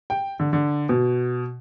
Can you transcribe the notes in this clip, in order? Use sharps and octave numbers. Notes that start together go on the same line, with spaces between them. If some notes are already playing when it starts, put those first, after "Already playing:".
G5
D3
D3
B2